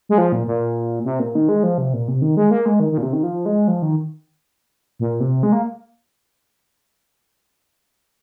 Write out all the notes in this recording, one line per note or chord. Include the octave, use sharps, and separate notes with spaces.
G#3
F3
A#2
A#2
C3
A#2
D#3
G#3
F3
C3
A#2
C3
D#3
G#3
A#3
G#3
D#3
D#3
A#2
C3
D#3
F3
G#3
F3
D#3
A#2
C3
G#3
A#3